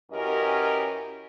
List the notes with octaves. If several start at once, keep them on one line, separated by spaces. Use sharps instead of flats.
F#2 E3 C#4 G4 A#4 D#5